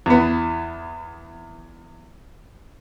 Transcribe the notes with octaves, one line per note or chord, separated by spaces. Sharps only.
E2 B3